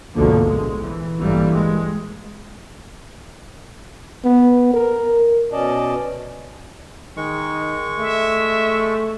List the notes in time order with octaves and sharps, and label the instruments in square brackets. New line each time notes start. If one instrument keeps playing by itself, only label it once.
[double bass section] G#1 D2 B2 D3 F3 A#3
A#1 G#3
E3
A1 G2 E3 G3 A#3
G#3
[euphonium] B3
A#4
[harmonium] B2 C#4 D5 D#5 A5
[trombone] D#3 [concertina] G#3 C#6
[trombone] A3 [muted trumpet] E5